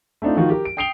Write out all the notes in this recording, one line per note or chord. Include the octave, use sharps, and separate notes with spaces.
A3 C4 D4 D#4 F4
D#3 F3 D#4 F4 F#4
G4 A#4
D7
G5 D#6 C7 D7 F7 G7